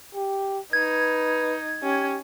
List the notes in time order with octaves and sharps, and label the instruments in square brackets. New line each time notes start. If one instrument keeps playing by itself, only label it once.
[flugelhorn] G4
[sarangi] D#4 [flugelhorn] B4 [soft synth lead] G#6
[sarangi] C#4 [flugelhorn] G4